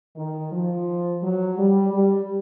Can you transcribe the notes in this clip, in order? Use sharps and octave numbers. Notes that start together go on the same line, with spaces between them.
D#3
F3
F#3
G3
G3